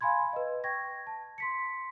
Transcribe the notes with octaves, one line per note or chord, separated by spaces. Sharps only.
F5 G#5 B5 C6 G#6
B4 D#5
G5 C#6 G#6 A#6
A5
C6 B6 C#7